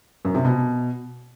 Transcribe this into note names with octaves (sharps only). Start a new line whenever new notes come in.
F#2
C3
B2